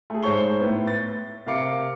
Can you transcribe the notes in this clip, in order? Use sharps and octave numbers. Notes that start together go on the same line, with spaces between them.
A3 G#4
G#2 C5 C#5 C#6 G7
A2 B3
A6
C3 A#4 F5 D6 C#7